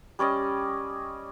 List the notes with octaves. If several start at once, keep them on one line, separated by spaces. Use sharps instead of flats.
G3 C#4 D5 D#5